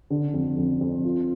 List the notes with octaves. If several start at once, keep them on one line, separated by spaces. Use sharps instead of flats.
D3
F2
F2
F2
F4